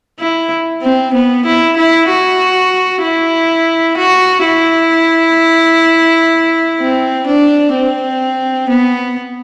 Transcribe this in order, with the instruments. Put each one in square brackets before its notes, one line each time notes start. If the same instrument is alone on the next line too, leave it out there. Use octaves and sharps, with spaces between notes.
[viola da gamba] E4
C4
B3
E4
E4
F#4
E4
F#4
E4
C4
D4
C4
B3